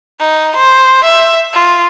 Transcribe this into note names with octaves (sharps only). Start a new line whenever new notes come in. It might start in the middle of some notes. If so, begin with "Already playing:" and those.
D#4
C5
E5
F4